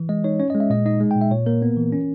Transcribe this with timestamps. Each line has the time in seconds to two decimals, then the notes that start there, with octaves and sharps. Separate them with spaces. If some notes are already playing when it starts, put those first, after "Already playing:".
Already playing: E3
0.09 G#3 D#5
0.24 D#4 C#5
0.39 C#4 C#5
0.50 D#5
0.55 G#3
0.60 E5
0.70 A#2 D#5
0.86 D#4 D#5
1.01 G#3
1.11 G5
1.16 A#2
1.21 E5
1.31 A#2 C#5
1.46 A#3 A#4
1.62 B3
1.77 E3
1.92 C#4